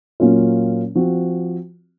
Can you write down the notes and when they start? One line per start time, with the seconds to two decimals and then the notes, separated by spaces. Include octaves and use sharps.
0.20 A#2 F#3 A#3 C#4 F4
0.95 F3 C4 F#4